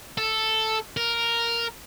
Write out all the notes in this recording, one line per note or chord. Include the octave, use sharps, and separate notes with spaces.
A4
A#4